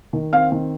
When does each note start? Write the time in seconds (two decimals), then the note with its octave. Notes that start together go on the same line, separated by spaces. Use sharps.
0.13 D#3
0.32 C4 F5
0.52 D#3